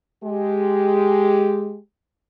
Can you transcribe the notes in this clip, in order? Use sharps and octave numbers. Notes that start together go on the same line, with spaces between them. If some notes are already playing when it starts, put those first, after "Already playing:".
G#3 G4